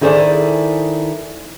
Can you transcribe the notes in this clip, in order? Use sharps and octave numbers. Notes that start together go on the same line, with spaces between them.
D#3 E4 G#4 A4 C5 D5